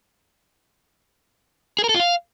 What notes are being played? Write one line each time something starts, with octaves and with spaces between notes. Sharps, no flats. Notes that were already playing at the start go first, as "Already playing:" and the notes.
G#4
A#4
A4
F4
F5